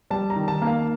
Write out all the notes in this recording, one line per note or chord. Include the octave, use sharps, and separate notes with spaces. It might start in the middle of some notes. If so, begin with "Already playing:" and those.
G3 A5
A#5
D#3
A5
A#3
F5